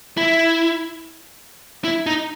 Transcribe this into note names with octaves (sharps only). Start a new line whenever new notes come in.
E4
E4
D#4